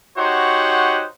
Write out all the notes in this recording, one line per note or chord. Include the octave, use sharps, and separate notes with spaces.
D#4 F#4 G4 C5 C#5 F#5